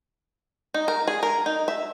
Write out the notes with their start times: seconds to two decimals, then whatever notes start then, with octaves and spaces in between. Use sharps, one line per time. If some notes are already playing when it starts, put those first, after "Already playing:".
0.74 D#4
0.88 A#4
1.07 G#4
1.23 A#4
1.46 D#4
1.68 E5